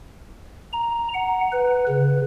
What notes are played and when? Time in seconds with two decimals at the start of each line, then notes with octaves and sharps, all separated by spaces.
0.73 A#5
1.14 F#5
1.53 B4
1.88 C#3